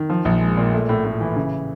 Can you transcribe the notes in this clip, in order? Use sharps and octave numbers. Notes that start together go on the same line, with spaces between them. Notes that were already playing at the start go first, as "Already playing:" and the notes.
Already playing: D#3
F3
A#1
G#3
A#2
A3
A2
A2
E3
C#3